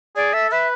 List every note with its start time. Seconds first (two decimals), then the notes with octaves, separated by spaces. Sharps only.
0.16 G#4 D5
0.33 A4 E5
0.51 B4 E5